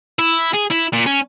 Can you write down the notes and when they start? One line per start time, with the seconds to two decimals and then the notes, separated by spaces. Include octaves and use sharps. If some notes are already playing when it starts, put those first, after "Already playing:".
0.19 E4
0.54 G#4
0.70 E4
0.93 A#2
1.06 C#4